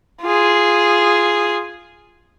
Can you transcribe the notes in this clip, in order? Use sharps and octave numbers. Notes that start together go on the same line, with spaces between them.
F4 G#4